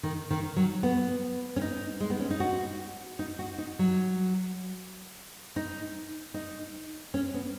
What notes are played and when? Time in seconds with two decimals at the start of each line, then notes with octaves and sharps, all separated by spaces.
0.03 D#3
0.30 D#3
0.56 F#3
0.83 B3
1.56 C#4
1.61 D#4
2.00 G#3
2.10 B3
2.20 C#4
2.30 D#4
2.40 F#4
3.19 D#4
3.39 F#4
3.58 D#4
3.79 F#3
5.56 D#4
6.34 D#4
7.14 C#4
7.34 B3